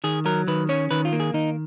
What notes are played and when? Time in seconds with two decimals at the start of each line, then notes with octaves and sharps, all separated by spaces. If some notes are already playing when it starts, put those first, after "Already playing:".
0.04 D#3 G#4
0.26 F#3 A#4
0.48 D#3 B4
0.69 C#4 C#5
0.91 D#3 B4
1.05 F4
1.13 A#3
1.20 G#4
1.34 D#3 D#4